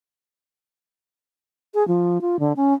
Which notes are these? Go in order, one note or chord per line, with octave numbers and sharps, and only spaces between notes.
G#4
F3
F4
D3
C#4